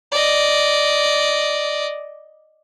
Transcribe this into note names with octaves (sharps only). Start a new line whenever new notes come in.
D5 D#5